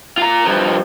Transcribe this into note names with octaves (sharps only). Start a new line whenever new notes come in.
F4 A#5
G2 F3